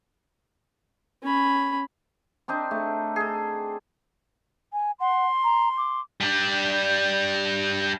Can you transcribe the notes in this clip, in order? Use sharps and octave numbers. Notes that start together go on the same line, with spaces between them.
C#4 B5
C4 D4 D#4
A3
G#4 A4
G#5
F#5 C6
A#5
D6
G3 D4